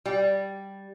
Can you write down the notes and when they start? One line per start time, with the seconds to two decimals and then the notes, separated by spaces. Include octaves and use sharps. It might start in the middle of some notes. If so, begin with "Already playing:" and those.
0.06 G3